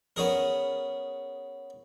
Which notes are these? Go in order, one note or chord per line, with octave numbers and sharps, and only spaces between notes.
B3 C#4 G#4 A#4